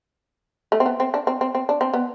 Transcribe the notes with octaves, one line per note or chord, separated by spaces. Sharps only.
A3
C4
B3
C4
D4
C4
C4
C4
D4
C4
B3